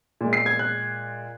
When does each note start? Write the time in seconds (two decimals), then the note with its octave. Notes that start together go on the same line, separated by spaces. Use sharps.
0.21 A#2 G#3
0.33 C7
0.46 G#6
0.59 F#6